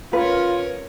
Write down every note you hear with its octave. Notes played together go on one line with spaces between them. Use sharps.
C#4 F4 A#4 B4 C#5